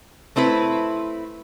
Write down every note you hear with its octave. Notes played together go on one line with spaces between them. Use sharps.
A3 C4 E4 B4